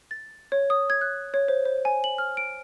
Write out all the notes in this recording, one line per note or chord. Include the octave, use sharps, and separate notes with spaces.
A6
C#5
D#6
G#6
F#6
C#5
C5
C5
G#5
F#7
F6
D7